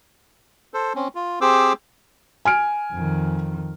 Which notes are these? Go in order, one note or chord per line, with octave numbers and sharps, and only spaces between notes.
A4 C5
C4 C#4
F4
C4 G4 G#4 C5 D6 E6
G#5 F6 D7
F2 D#3